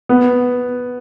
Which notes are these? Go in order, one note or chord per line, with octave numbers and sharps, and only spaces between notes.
B3